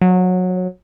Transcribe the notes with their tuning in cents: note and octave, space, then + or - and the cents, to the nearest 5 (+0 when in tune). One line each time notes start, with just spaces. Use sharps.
F#3 -20